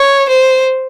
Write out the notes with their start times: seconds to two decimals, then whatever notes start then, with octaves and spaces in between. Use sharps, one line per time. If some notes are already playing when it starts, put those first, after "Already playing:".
Already playing: C#5
0.29 C5